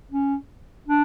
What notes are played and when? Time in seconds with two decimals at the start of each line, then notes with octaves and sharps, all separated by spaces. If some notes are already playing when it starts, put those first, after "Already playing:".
0.12 C#4
0.88 D4